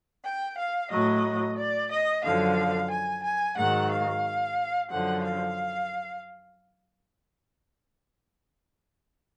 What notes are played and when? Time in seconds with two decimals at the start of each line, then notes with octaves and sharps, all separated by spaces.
0.23 G5
0.56 F5
0.90 A2 F#3 D#5
1.56 D5
1.90 D#5
2.23 F#2 D3 F3 F5
2.90 G#5
3.23 G#5
3.56 G#2 D#3 F#3 F#5
3.90 F5
4.89 F#2 D3 F3 F#5
5.23 F5